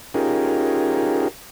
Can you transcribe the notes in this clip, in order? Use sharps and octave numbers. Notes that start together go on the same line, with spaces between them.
C#4 D#4 F4 G4 G#4 A#4